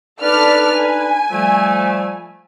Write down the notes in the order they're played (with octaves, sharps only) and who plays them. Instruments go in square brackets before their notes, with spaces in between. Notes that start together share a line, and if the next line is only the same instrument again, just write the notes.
[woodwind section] D4 D#4 B4 [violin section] A4 D5 F6
[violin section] G#5
[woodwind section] F3 G3 A3